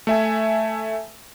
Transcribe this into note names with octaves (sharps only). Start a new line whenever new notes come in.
A3 E5 G#5